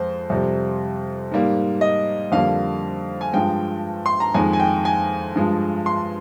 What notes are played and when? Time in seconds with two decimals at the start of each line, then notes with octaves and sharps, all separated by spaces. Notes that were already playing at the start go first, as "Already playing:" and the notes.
Already playing: F2 G#3 C5
0.30 F2 C3 G3
1.32 G#2 G3 A#3
1.81 D#5
2.32 F2 D3 G3 A#3 F5
3.21 G#5
3.33 G2 F3 G#3 G5
4.06 C6
4.20 A#5
4.34 F2 D#3 G#3 G#5
4.53 G#5
4.60 G5
4.85 G#5
5.35 G2 F3 G#3
5.86 C6